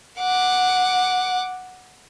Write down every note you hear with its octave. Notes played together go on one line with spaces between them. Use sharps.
F#5 D6